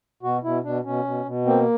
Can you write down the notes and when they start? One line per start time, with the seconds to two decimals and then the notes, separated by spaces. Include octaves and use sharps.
0.23 B2 F#4
0.43 B2 E4
0.64 B2 D4
0.84 B2 C#4
1.05 B2
1.25 B2
1.45 A#3 C4